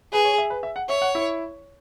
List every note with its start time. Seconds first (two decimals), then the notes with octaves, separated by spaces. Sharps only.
0.12 G#4 B4
0.25 C#5
0.38 E5
0.50 B4
0.63 E5
0.76 F#5
0.88 C#5 E5
1.02 F#5
1.15 E4